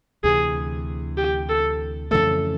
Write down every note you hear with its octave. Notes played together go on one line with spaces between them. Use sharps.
D2 C3 E3 G#4
G4
A4
F2 C#3 E3 A3 A4